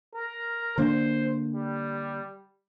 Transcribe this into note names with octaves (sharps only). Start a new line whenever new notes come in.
A#4
D3 A#3 D4 C5
G3